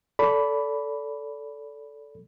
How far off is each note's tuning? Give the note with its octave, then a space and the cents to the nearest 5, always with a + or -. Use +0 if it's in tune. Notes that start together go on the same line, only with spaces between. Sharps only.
A4 +0 D5 -30 B5 +0